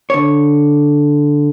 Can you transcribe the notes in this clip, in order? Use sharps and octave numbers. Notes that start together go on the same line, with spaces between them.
D3 C#5